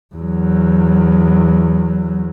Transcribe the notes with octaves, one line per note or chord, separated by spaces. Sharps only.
E2 F#3